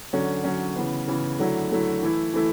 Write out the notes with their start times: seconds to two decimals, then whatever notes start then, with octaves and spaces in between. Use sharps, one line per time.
0.13 D3 F#3 C#4
0.44 D3 F#3 C#4
0.76 C#3 E3 B3
1.08 C#3 E3 B3
1.39 D3 F#3 A3 E4
1.71 D3 F#3 A3 E4
2.03 E3 A3 E4
2.33 E3 A3 E4